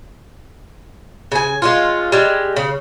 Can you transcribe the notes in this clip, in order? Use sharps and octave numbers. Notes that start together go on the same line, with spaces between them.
C#3 G#5
G#3 C#4 F4
G3 G#3
C#3